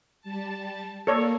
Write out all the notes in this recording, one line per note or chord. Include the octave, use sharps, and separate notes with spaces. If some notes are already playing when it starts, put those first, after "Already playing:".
G3 A5
A#3 A4 C#5 D5